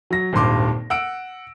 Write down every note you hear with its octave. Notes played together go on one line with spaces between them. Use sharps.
F#3 A#6
D#1 G#1 G2 C6 D6
F#5 E6 D7